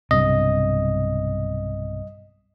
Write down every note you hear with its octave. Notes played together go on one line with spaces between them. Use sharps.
B1 G2 C3 D#5